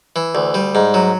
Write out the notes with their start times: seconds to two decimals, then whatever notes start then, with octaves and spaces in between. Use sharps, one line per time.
0.16 E3
0.35 D2
0.54 G3
0.75 G#2
0.94 F#3